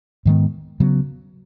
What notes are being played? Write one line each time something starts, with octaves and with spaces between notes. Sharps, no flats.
G#2 D#3 G#3 B3
C#3 F#3 B3